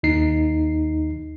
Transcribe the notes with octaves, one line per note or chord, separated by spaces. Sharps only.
D#2 D#4 C7